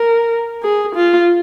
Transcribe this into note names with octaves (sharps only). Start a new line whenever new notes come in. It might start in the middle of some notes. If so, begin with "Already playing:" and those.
Already playing: A#4
G#4
F4